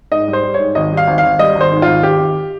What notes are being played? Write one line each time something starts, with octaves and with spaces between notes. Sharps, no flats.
G#2 D#5
G3
C5
G3
C#5
G#2
G#1 D#5
G3
F5
G#1
F5
G#1
G3 D#5
G#1
C5
G#2
F4
G#1
G#1 G4
G#1